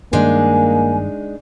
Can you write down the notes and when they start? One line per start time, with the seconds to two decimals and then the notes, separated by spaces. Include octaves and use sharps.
0.13 G2 D#3 G3 G#3 A#3 D4 D#4 G#5